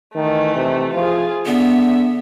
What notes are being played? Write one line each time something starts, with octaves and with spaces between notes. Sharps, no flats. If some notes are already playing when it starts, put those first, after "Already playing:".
D#3 E3 A3
C3
F3 F4 G#4
D3 B3 E5